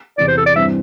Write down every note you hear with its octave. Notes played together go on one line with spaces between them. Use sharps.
E2 C3 E3 D5
C5
A4
D5
G2 E3 C4 E5